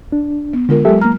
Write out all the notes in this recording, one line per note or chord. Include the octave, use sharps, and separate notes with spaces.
D4
B3
D3 G#3 F4 A#4
F#3 G#3 G4 A4 E5
A#3 A#5 F6